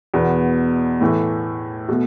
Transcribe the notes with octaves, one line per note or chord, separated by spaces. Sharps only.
E2 B2 B3
A2 E3 A3
B2 A3